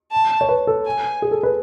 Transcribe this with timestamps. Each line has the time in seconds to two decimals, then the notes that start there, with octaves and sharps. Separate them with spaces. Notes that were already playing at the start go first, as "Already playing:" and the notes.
0.12 A5
0.41 C#5
0.49 B4
0.67 A4
0.86 G#5
1.22 G#4
1.31 A4
1.43 B4